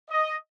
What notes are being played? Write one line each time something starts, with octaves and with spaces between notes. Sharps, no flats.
D#5